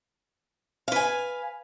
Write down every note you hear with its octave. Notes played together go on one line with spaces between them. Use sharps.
B4 F5 G#5